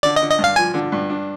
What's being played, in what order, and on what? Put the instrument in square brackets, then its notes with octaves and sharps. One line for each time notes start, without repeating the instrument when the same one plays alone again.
[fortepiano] D3 [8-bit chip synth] D5
[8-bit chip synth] D#5
[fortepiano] D3
[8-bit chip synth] D#5
[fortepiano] G2
[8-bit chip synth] F5
[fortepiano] F3 [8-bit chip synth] G#5
[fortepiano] D3
G2
D4